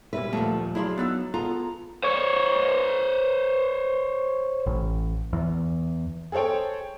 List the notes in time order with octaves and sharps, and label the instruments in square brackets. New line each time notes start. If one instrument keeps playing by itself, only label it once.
[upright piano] A#2 G3 E5 [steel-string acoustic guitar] B4
[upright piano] D#1 D2 [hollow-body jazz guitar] A#2 F3 [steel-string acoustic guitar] A3
[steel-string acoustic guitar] F#3 [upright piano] D4 F5 C6 [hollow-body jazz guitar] E4 G#4 B5
[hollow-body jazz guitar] B3 D#4 [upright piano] E6 F#6 A6
[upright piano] B3 G#4 A4 [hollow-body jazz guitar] F4 [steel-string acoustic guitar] A#5
[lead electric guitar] C5 C#5
[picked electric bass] A1
E2
[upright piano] G#4 A4 C5 C#5 G5